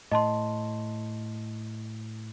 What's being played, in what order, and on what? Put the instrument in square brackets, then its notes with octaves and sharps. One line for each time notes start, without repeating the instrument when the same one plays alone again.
[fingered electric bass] A2 [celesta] D#5 A5 C6